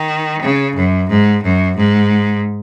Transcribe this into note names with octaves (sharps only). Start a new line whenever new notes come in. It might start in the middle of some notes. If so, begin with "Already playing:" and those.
Already playing: D#3
C#3
F#2
G#2
F#2
G#2